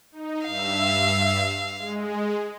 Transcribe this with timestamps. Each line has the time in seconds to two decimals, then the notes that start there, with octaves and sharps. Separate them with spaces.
0.12 D#4
0.46 G2 E5 F5 E6
1.78 G#3